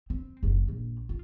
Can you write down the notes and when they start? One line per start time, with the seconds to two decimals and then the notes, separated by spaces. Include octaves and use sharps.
0.10 C4
0.43 F#1 F#2
0.68 A#1
1.09 F4